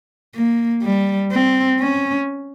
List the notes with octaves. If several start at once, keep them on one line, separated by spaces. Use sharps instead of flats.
A#3
G3
C4
C#4